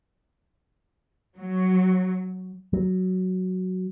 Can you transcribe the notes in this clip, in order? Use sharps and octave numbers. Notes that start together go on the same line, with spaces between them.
F#3
F#3